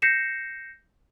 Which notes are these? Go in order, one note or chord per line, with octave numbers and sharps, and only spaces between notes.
G6 A#6 C7 C#7 E7